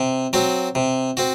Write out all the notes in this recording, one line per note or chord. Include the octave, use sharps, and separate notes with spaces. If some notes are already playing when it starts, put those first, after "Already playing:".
Already playing: C3
F#3 C4 F#4
C3
C4 F#4